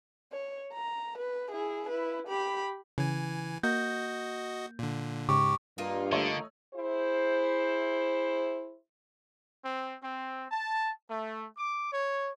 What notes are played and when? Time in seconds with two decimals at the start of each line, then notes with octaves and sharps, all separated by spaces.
0.32 C#5
0.73 A#5
1.18 B4
1.51 E4 G#4
1.89 E4 B4
2.27 G4 B5
2.98 C#3 E3 G#5
3.63 A#3 F#4 D#5 G6
4.79 A#2 D3
5.29 G#2 C#3 G4 C#6 D6
5.78 G2 A#3 D#4 F4
6.12 D3 A3 C#5 D#5
6.74 E4 G#4 C5
9.64 C4
10.03 C4
10.51 A5
11.09 A3
11.57 D6
11.93 C#5